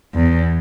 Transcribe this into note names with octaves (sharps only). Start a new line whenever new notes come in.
E2